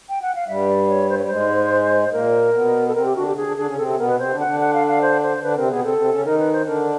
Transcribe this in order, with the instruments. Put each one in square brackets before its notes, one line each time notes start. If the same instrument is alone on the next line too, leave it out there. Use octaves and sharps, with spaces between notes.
[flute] G5
F#5
F5
[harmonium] G2 G3 [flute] E5
[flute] D5
C#5
C5
[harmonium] G3 [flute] C#5
[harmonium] G#2 G#3 [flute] C5
[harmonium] A#2 A#3 [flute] A#4
[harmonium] B2 B3
[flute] A4
[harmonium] C3 C4 [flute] A#4
[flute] G4
[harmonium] D3 D4 [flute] F#4
[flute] G4
[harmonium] D3 D4 [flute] G#4
[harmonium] D3 D4
[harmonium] D3 D4 [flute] G#4
[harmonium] C#3 C#4
[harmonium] C3 C4 [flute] A4
[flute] A4
[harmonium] B2 B3 [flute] A#4
[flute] B4
[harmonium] C3 C4 [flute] C5
[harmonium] D3 D4
[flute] F#5
[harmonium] D3 D4
[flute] F#5
F5
F5
C5
C5
[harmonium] D3 D4 [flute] B4
[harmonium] C3 C4 [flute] A#4
[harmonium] B2 B3 [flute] G#4
[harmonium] C3 C4 [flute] A4
[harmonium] C3 C4
C#3 C#4
[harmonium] D#3 D#4 [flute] A#4
[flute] B4
C5
[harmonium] D3 D4 [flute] A#4